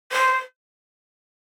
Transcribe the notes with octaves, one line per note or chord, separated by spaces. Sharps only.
C5